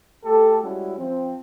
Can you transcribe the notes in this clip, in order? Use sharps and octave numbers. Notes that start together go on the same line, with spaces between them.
A3 G4 A4
G3 G#3 C#4 E4 F#4
F3 C4